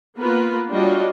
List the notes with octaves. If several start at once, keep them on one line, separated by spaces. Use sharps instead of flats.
A#3 B3 F4 A#4 B4
G3 D4 F4 F#4 C#5 D#5